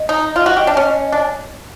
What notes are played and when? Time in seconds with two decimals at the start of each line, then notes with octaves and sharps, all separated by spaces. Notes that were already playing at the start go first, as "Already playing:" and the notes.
Already playing: D#5
0.09 D#4
0.36 F4
0.46 F#4
0.57 G4
0.67 D4
0.77 C#4
1.12 D4